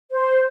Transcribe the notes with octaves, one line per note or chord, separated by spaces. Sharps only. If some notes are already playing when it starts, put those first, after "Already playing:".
C5